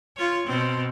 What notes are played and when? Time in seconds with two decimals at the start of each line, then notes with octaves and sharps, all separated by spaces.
0.17 F4 C#5
0.47 B2 C4